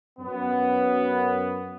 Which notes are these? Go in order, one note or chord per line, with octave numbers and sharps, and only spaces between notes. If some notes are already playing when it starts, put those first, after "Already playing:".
F#2 B3